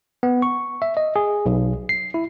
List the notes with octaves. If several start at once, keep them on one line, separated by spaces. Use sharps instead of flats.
B3
C#6
E5
D#5
G#4
B1
C7
E4